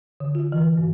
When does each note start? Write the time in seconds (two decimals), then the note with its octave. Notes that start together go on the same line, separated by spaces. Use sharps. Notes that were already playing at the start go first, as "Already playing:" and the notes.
0.20 D3
0.35 F4
0.52 E3
0.77 G2